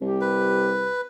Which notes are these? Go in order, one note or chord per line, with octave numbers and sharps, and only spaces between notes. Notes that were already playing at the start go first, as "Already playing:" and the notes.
C2 G4
B4